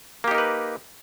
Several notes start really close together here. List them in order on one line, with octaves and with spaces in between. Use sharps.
A#3 G4 D#4 A#4 B4